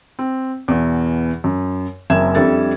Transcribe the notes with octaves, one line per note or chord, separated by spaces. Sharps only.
C4
E2 B2 E3
F#2
F#1 F#2 C4 E5 G#6 E7
F2 G3 D4 A4 E5 A6